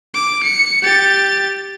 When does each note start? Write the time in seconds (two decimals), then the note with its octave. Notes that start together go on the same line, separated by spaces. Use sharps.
0.14 D6
0.43 C#7
0.83 G4 A6